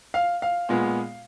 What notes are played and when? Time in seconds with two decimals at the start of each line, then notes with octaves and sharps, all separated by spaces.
0.14 F5
0.42 F5
0.69 A#2 G#3 B3